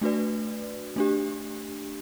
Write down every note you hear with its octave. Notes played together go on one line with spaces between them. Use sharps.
A3 D4 F#4 B4 D5
A3 D4 G4